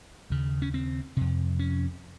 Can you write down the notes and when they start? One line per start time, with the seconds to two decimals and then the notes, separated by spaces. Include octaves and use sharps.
0.30 D#2 C#3
0.62 C#4
0.74 C4
1.17 F2 C3
1.59 C#4